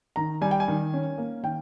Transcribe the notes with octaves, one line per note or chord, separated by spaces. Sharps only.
D#3 A#5
G3 G#5
G5
G#5
D#3
C#4
A#3
D#3 G5